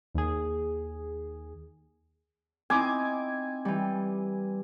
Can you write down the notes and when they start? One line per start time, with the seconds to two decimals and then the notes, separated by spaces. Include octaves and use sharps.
0.15 D#2 G#4
2.70 C4 D#4 E4 G#5 D6
3.65 E3 G3